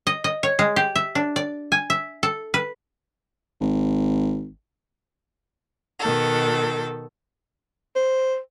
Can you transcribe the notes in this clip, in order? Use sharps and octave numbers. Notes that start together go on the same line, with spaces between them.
D#5
D#5
C#5
G#3
G4
E5
D4
D5
G#5
E5
A4
B4
G#1
B2 D#3 A4
C5